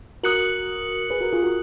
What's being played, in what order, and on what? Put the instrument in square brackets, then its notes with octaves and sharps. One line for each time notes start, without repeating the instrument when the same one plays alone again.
[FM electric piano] F#4 A#4 [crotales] D#6 F#6 C#7 F#7
[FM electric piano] G#4 B4
F#4 A#4
F4 G#4
F#4 A#4